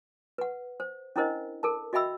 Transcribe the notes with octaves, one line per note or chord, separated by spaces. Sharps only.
B4 F#5
C5
C#4 D4 E4 A#4 C5 D#5
A4 A#4 A5
F#4 D#5 E5 G5 B5 E6